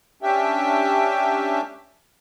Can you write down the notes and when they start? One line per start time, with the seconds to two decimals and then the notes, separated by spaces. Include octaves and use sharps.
0.22 C#4 D4 G4 E5 G5